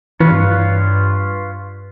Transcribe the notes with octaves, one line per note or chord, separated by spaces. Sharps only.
G2 E3 F4 B4 C#5